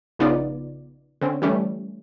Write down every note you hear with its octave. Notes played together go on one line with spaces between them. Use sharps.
A#1 C#3 B3 D#4 F4 D5
D3 C4 C#4
E3 G3 A3 C#4